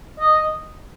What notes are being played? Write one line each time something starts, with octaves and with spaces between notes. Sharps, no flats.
D#5